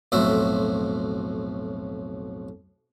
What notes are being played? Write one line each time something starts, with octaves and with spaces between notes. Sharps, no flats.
B1 F2 A2 F#4 E5